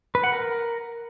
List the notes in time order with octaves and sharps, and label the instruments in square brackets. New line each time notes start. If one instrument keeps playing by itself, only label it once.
[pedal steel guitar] B4
F#5
A#4